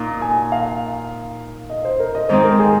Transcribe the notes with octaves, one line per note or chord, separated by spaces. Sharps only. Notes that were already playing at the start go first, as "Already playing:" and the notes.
Already playing: A#2 A#3 D#4
G#5
F5
D#5
C5
A#4
D#5
G#2 D#3 G#3 C4 D#4 C5
A#4
G#4